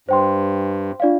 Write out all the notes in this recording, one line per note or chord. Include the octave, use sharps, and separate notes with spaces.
G2 C5 G5 C6
D4 F4 D5 F5